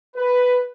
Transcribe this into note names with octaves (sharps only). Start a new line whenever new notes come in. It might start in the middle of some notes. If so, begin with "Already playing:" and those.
B4